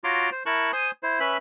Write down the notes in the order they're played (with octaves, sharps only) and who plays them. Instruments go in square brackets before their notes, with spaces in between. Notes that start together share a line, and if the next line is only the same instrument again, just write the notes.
[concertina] F4 F#4 C#5 A#5 C6 D6
C5
E4 A#4 A5 C#6 F#6
C5 G#5 C6 D#6
E4 C5
C#4 B4 E5 B5